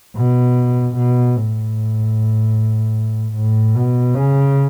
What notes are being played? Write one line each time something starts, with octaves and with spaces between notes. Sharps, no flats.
B2
B2
A2
A2
B2
C#3